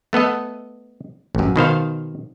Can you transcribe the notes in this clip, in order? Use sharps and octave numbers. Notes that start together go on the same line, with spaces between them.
A3 B3 A4 D#5
A1 F#2
B2 D#3 C5 F5